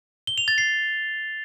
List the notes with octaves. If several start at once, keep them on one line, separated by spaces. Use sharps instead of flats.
G7
F7
A6
C7